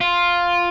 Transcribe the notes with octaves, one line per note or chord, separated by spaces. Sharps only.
F4